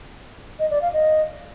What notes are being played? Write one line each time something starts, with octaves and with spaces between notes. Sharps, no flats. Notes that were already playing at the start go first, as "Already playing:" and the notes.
D#5
D5
F5
D#5